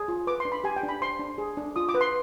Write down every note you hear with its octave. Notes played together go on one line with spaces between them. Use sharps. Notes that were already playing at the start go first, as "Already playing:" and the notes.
Already playing: G#4
F4
B4 D6
C6
D4
B5
G4 G#5
G5
D4
B5
C5 C6
D4
G#4
D4
F4 D#6
D6
B4
C6